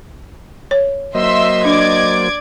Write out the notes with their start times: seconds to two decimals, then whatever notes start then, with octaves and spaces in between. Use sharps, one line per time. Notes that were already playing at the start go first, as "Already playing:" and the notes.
0.71 C#5
1.15 F#3 A#3 C5 D#5 E5 C6 E6
1.65 D4 D5 D6 G#6